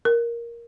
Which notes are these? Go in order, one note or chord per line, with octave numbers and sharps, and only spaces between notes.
A#4